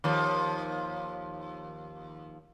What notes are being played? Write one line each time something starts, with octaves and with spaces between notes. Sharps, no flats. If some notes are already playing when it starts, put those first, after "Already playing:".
D#2 F3